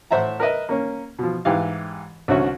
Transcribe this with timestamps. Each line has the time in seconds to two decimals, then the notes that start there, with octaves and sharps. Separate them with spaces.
0.11 A2 C5 E5 F#5 A#5
0.40 A#4 B4 D#5 E5
0.69 A#3 C#4
1.19 B2 F3
1.45 G#2 E3 G4 F5
2.28 C2 D3 C#4 F#4 E5